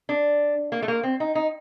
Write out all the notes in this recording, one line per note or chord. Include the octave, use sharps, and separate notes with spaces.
D4
A#3
A3
A#3
C4
D#4
D#4